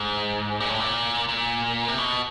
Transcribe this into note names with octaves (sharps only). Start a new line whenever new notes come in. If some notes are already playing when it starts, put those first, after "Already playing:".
Already playing: G#2
A#2
A2
A#2
A#2
C3
B2